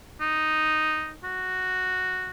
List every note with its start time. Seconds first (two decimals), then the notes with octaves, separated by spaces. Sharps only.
0.20 D#4
1.24 F#4